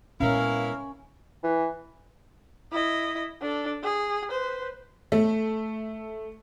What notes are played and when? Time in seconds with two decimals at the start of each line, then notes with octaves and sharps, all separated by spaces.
0.20 A#2 G#3 B3 C#4 E4 A#4 F5
1.43 E3
2.72 E4 D#5
3.41 D4 A4
3.84 G#4
4.30 B4 C5
5.12 A3